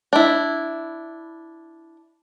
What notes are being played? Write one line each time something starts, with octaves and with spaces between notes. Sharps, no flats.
D4 E4